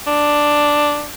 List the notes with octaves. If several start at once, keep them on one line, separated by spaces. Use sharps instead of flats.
D4